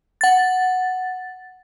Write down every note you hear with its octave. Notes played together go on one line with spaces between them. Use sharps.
F#5 A6